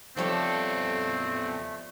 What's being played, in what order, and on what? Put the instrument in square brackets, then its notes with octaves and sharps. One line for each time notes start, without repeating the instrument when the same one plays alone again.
[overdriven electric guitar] E2 A4 [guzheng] F3 G3 C#5 [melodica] A3 [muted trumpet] C4